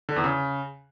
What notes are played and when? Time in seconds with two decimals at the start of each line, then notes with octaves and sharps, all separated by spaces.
0.09 D3
0.16 E2
0.24 C#3